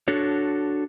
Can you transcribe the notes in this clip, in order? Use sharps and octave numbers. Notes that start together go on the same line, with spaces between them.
D4 F#4 A4 C#5